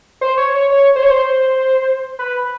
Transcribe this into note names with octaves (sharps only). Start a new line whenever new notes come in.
C5
C#5
C#5
C#5
C5
C#5
C5
B4